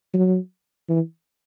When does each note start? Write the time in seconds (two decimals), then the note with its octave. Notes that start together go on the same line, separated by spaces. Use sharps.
0.14 F#3
0.89 E3